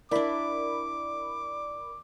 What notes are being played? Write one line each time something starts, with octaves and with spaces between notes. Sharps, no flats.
D4 E4 A#4 D5 B5 D6